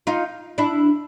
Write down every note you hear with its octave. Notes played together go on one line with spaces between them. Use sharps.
D#4 F4
D4 E4